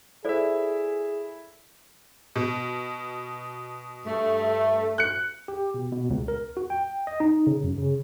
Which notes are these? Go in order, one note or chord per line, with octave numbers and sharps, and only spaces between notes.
E4 G#4 A4 C5 D5 E5
B2
G2 A3
F#6 C#7
G4
B2
B2
C#2
A#4
F#4
G5
D#5
D#4
C#3
F#2
C#3